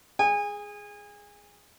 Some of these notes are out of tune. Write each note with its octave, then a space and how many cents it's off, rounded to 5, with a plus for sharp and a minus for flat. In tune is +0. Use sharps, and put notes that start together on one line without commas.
G#4 +0 G#5 -30